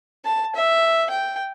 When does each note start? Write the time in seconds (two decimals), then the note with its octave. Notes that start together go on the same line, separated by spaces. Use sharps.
0.25 A5
0.55 E5
1.10 G5